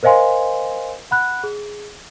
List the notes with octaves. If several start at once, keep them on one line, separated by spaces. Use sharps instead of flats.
A#4 C5 D#5 F5 G#5 C6
F#5 B5 F#6
G#4